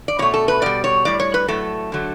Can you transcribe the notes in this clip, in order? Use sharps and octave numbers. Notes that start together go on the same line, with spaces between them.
D5
B2 A3 C#5
A4
B4
B2 G3 D5
C#5
A2 G3 D5
C#5
B4
A2 F#3 A3 A4
D3 F#3 A3